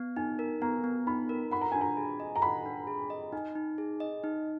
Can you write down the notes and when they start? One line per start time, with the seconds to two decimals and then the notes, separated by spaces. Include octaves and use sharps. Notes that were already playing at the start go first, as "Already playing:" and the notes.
Already playing: B3
0.16 D#4 G#5
0.39 A#4
0.62 B3 A#5
0.84 B3
1.07 D#4 B5
1.29 A#4
1.51 F#5 B5
1.61 A#5
1.72 D4 G#5
1.81 A#5
1.97 G#4
2.20 D#5
2.36 A#5
2.42 F#5 B5
2.66 D4
2.87 G#4
3.10 D#5
3.32 D#4 G#5
3.55 D#4
3.78 G#4
4.00 D#5
4.24 D#4